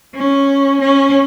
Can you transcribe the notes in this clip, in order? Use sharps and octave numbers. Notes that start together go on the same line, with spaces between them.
C#4
C#4